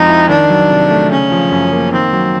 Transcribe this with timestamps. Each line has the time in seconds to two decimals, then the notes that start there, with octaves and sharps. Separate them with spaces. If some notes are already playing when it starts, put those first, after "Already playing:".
Already playing: F2 F3 G#3 C4 D#4
0.09 E4
0.29 D#3 D4
0.50 F#3
0.70 C3
0.91 A3
1.11 C#3 C#4
1.31 F3
1.52 F#2
1.73 A#3
1.93 D#3 C4
2.13 F#3